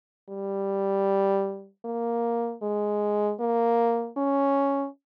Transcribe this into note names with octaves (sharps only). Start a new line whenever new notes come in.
G3
A#3
G#3
A#3
C#4